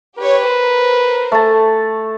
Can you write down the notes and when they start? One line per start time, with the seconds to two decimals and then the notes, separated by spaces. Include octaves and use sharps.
0.18 G4 B4 C#5
0.49 A#4 C5
1.32 A3 A5